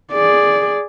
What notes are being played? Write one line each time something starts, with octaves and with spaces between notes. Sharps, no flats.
G#4 D5